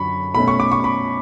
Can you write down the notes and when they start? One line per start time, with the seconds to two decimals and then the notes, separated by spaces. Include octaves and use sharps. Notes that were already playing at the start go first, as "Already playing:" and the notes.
Already playing: F#2 D3 F#3 B5 C#6
0.35 B2 A3 C#4 B5
0.48 C#6
0.60 D6
0.72 C#6
0.84 B5